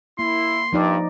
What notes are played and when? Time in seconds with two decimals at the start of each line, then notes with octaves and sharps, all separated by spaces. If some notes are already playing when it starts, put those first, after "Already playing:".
0.19 A#3 E4 C6
0.73 G2 F3 D#4 D5